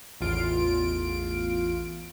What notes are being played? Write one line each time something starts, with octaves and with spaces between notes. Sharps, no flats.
A1 E2 F4 D7